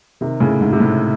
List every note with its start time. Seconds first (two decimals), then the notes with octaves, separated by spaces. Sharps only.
0.21 C3 D#3
0.40 A2 C#3
0.61 G#2
0.73 C3
0.80 A2